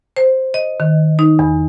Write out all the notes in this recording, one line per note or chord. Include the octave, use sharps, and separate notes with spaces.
C5
D#5
D#3
D#4
E2